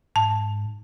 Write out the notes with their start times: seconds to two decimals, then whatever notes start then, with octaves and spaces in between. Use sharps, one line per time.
0.16 G#2 A5